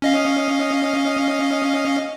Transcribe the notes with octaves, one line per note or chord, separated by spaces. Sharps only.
C#4 D#5 F5